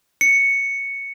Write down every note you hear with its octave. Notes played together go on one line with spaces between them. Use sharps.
C#7